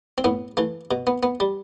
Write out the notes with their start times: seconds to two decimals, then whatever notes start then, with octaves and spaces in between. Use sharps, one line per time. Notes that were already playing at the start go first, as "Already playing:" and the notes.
0.18 C4
0.24 A2 B3
0.57 E3 A3
0.91 B2
1.07 B3
1.23 B3
1.40 G3